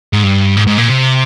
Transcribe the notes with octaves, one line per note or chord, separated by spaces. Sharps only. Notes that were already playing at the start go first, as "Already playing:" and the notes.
G#2
G2
G#2
G#2
A#2
C3